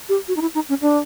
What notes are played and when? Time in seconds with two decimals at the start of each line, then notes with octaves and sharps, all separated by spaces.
0.09 G4
0.28 F#4
0.37 D#4
0.41 E4
0.55 D#4
0.69 C#4
0.82 D4